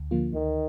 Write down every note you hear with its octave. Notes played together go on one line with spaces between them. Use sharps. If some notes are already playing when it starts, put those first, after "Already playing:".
Already playing: D2
D3 F3 A#3 F4
D2 D#3